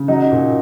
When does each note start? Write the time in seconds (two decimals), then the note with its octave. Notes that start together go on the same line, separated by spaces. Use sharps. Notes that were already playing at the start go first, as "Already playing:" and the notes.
Already playing: C#3
0.08 F#3 D#4
0.32 A#2